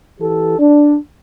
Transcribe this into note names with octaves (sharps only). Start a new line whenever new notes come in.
E3 G4 A4
D4